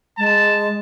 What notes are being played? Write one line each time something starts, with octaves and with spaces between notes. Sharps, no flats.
G#3 A5